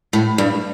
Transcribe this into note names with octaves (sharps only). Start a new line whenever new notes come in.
A2
G2